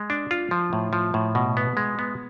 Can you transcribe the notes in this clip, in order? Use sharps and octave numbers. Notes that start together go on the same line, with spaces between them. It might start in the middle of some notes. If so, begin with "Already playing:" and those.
Already playing: G#3
D4
F4
F3
A2
F3
A2
B2
B3
G#3
B3